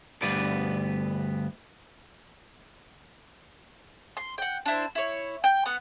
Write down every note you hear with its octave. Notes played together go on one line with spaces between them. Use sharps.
D2 G2 B3 B4 D5
C6
F#5 G5
D4 E4 C5
E4 C#5
G5
B3 F#5